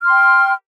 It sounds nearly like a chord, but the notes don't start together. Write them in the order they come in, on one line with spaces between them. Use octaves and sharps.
F6 C6 G5